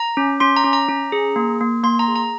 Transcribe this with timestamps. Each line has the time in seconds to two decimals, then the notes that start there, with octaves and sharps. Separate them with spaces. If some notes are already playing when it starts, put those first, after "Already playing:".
Already playing: A#5
0.17 C#4
0.40 C#4 C6
0.57 A#5
0.64 C#4
0.73 A#5
0.89 C#4
1.12 G#4
1.36 A#3
1.61 A#3
1.84 A#3 C6
1.99 A#5
2.08 G#4
2.16 A#5